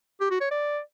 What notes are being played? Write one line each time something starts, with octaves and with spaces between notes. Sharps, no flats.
G4
F#4
C#5
D5